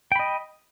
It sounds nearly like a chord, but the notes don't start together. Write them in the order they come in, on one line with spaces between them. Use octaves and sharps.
G5 B5 D#5